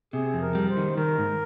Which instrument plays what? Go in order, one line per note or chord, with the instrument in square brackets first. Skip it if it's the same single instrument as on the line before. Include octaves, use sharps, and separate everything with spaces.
[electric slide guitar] C3 [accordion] G#4
[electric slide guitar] F2
[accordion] A#4
[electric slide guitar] G3
[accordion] C5
[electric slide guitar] D#3
[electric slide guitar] D#3 [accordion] A#4
[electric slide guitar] G#2